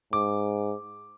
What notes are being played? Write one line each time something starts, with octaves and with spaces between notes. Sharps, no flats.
G#2 D6